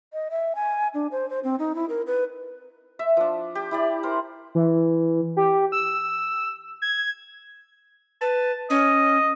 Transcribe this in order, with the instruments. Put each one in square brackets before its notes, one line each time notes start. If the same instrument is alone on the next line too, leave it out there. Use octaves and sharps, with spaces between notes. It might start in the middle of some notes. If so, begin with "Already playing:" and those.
[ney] D#5
E5
G#5
D4
C5
C5
C4
D#4
E4
A#4
B4
[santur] E5
F3 D4
G4
E4 G4 D5
A#4 C5
[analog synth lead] E3
G4
E6
G#6
[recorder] B4 [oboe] A5
[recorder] C#4 [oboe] D#5